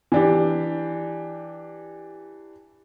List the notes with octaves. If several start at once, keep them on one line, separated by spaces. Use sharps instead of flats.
E3 D4 G4